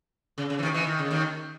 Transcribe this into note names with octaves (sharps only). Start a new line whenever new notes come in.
C#3
C#3
E3
D#2 D#3
E3
D#3
C#3
D#2 D#3